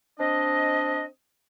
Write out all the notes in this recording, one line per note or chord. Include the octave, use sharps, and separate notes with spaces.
C4 D4 D#5